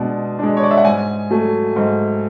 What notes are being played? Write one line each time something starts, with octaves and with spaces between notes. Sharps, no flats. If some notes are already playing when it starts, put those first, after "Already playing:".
Already playing: B2 G#3 D4
G#3 D4
C#5
D5
E5
F#5
G#2 G#5
F#3 A3
G#2